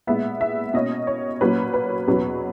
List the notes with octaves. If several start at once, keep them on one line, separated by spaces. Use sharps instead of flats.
A#2 G#3 B3 E5
E5
B2 A#3 C#4 D#5
C#5
A#2 F#3 A#3 C#4 B4
B4
E2 B2 F#3 C#4